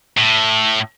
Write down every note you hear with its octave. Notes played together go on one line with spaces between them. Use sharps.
A2